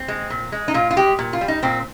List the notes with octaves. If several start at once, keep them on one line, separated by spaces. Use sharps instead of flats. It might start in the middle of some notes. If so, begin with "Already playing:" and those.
Already playing: C4
G#3
A#2
G#3
D#4
A#2 F4
F4
G#3 G4
A#2
F4
G3
D#4
A#2 C4